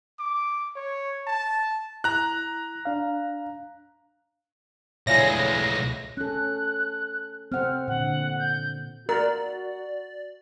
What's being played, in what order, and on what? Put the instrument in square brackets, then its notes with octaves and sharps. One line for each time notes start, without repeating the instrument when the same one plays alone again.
[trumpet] D6
C#5
A5
[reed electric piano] E4 [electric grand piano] A#5 F#6
[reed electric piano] D4 F5
[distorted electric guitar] B1 G#3 [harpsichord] A2 D3 F3 [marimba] C#5 G#5 [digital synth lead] A#6
[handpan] C#4 A4 [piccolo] F#6
[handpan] C4 F#5 [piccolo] F6
[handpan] A#2 D3 [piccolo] F#5
[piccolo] G6
[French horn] F#4 [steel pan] A#4 [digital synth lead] D5